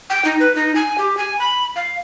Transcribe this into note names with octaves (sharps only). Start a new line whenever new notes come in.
G5
D#4
B4
D#4
G#5
G4
G#5
B5
F5